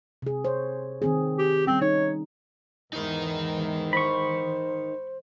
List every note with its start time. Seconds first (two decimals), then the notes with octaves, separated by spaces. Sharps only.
0.22 C3 G#4
0.45 C5 C#5
1.02 D#3 C4 G#4
1.39 G4
1.67 G3 C4 C#4
1.82 D#4 C#5
2.93 E2 G#2 E3 D#4 A#4
3.93 C5 B5 C#6